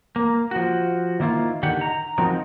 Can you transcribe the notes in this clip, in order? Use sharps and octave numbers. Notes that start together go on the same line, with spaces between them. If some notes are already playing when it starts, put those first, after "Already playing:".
A#3
F3 F#4
D#3 A#3 E4 F4
D3 D#3 G4 F#5
A#5
F3 C4 D#4 F#4 A#4